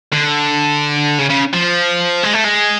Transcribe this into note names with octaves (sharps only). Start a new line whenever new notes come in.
D3
C#3
C#3
F3
G#3
A3
G#3